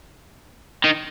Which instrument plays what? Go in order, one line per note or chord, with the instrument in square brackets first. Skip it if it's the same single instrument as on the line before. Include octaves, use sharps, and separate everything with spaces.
[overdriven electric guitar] D#3